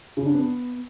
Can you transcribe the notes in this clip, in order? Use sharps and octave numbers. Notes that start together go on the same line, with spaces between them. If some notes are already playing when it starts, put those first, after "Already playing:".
C#3
D4
B3